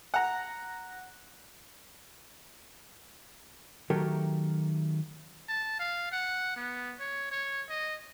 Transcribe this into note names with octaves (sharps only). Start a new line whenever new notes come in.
F#5 A#5
D#3 F#3 A3 G4 A4 A#4
A5
F5
F#5
B3
C#5
C#5
D#5